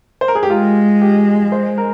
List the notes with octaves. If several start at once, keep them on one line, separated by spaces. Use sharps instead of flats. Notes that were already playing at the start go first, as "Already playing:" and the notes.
C5
A#4
G#4
G4
G#3 F4
G4
C5
A#4